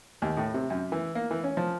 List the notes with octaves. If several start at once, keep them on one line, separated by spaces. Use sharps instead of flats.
D#2
A2
C3
F#2
E3
A#3
E3
C#4
F3